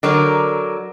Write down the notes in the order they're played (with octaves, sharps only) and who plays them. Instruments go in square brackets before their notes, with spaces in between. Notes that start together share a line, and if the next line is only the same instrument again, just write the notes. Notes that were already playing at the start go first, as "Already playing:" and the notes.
[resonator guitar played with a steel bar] D3 F#3 A#4